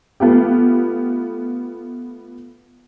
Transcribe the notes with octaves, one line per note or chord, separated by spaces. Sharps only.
A3 B3 F4 G4